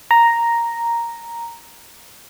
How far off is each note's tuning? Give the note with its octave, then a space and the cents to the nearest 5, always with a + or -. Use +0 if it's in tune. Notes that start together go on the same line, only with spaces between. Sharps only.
A#5 +0